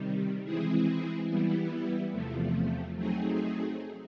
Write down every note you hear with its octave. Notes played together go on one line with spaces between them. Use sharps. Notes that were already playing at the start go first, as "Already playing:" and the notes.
Already playing: C3 D#3 G3
E3 G#3 C4 E4 G#4
E3 G3 B3 E4
E2 C3 F3 A3
F#3 A3 C4 D#4 G#4